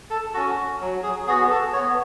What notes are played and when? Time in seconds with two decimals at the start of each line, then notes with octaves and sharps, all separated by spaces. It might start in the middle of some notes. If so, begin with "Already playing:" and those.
0.10 A4
0.34 C#4 F#4 A4
0.81 F#3
1.03 G#4
1.27 B3 F#4 G#4
1.50 A4
1.73 B3 C#5